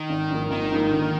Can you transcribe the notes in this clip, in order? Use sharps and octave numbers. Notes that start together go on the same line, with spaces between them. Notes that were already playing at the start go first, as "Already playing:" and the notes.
Already playing: D#3
G#1
G#2 F3 A#3
G#1 D#3
G#2 F3 A#3
D3